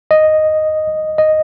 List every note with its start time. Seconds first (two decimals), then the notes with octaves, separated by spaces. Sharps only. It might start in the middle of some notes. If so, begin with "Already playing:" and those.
0.11 D#5
1.18 D#5